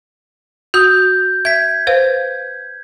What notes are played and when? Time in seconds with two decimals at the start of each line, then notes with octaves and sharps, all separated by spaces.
0.74 F#4 D#6 G6
1.45 E5 G#6 B6
1.87 B4 C5 F5